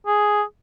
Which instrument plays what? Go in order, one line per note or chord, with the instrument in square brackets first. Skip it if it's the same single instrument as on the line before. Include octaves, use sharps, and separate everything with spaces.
[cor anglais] G#4